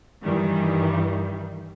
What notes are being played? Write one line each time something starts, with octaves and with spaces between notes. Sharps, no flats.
G2 D#3 E3 G3